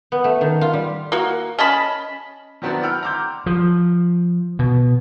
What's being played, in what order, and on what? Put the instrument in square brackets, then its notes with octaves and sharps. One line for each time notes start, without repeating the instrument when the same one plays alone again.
[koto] B3
A3
D#3
F4
G3
[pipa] A#3 F#4
C#4 D#5 A5 B5
[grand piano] D#3 F#3 B3 C4 D4 E4
F#5 G5 B5 E6 F6
A#5 C6 D6 E6 G6
[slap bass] F3
B2